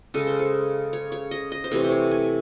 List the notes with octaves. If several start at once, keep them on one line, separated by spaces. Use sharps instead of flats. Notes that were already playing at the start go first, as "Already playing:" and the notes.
C#3 G#3 A4
C5
A4
C#5
C#5
D#5
D#5
C5
C3 E3 A3 C#5
C5
C#5
G#5